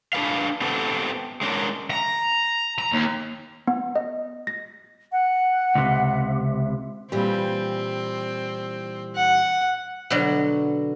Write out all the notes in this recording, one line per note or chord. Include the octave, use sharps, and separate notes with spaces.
D4 G#4 B4 F5
B3 C4 G4 A4
G#3 C#4 D4 A#4
A#5
A#5
D#2
B3
D#5
A#6
F#5
C#2 C3
A#2 E3 G3 C4
F#5
B2 D3 F#3